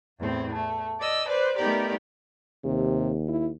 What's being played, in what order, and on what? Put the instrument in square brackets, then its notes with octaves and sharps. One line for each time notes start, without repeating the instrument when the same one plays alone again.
[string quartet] E2 A2 C4
A3
D5 D#5 E6
B4 C5 D5
A3 B3 D#4 G4 A#4 D5
[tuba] D#2 [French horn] C3
[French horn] E4